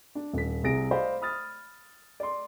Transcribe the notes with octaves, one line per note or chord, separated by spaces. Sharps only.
D4
D#1 B6
C2 C3 G#4 A#6 D7
C5 D5 D#5 F5 B5
B5 D#6 F6 A6
D5 C6